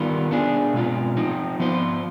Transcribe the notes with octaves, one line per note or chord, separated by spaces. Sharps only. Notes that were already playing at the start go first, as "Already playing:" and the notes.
Already playing: D#3 G3 B3 F4
B3 D4 G#4
B2 G#3 C4 F4
F3 C4 D#4
F3 B3 F4 C5